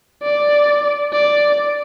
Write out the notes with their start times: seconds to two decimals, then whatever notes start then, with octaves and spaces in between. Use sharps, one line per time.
0.23 D5
1.13 D5